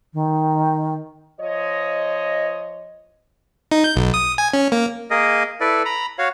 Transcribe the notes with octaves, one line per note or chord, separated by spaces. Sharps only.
D#3
F3 C#5 D#5
D#4
G6
B1
D#6
G#5
C#4
A#3
A#3 G#4 A#4 D#5
E4 A4 B4 D5
A#5 B5
F#4 C#5 F5